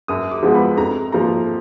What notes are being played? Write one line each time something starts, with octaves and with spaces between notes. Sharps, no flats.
F#2 D#6
D6
F3 G#3 B3
B5
F2 A#5
F3 A#3 A#5